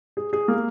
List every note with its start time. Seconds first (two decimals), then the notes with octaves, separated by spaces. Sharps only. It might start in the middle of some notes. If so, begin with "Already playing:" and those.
0.17 G#4
0.33 G#4
0.48 A#3